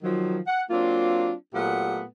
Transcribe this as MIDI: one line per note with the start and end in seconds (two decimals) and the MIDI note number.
0.03 0.39 51
0.03 0.39 53
0.03 0.39 54
0.47 0.61 78
0.70 1.33 54
0.70 1.33 58
0.70 1.33 60
0.70 1.33 62
0.70 1.33 65
1.54 2.03 46
1.54 2.03 54
1.54 2.03 57
1.54 2.03 59
1.54 2.03 67
1.54 2.03 78